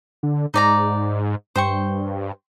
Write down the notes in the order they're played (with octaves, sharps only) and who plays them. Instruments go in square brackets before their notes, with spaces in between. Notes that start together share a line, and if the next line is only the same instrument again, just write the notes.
[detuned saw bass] D3
[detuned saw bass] G#2 [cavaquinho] D#4 D5 A#5
[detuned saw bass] G2 [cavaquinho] C5 G5 C#6